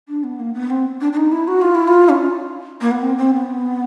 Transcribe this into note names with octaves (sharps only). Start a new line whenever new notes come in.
D4
B3
A#3
B3
C4
D4
D4
D#4
E4
F#4
F4
E4
F4
C#4
A#3
B3
C4
C4
B3